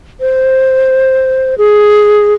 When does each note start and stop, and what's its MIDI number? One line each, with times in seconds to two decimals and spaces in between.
0.20 1.55 72
1.58 2.34 68